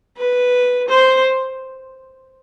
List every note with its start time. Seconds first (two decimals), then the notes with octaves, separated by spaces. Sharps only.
0.17 B4
0.88 C5